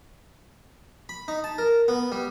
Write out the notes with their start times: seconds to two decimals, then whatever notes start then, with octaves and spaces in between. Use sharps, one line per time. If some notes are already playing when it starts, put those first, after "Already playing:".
1.09 B5
1.28 D#4
1.44 A5
1.58 A#4
1.88 B3
2.12 G3